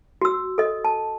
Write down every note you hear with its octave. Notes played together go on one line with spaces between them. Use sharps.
F#4 E6
A4 D#5
A5